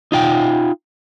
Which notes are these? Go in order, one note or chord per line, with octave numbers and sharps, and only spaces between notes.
D#4 F4 G5